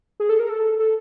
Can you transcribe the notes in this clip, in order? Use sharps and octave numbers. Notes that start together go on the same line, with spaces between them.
G#4
A4
A#4
A4
A4